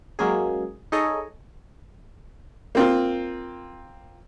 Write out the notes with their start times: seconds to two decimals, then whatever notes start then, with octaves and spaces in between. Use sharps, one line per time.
0.19 F#3 G#3 A#3 C#4 G#4
0.92 D#4 G#4 A4 C#5 D#5
2.75 A#3 C4 F4